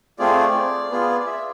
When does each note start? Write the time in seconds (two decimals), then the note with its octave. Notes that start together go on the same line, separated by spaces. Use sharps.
0.19 A3 C4 F4 G#4 D5
0.91 B3 F4 G#4
1.20 D5
1.26 E5